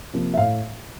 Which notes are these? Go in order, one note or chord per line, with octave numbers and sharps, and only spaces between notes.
C3 F3 A#3
E5
A2 F5